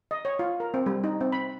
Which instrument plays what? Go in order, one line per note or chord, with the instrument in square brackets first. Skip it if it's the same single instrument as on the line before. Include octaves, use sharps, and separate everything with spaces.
[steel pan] D#5
C#5
F4
A#4
C4
G3
D#4
C4
B5